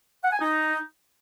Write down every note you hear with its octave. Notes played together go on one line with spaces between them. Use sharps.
F#5
G#5
D#4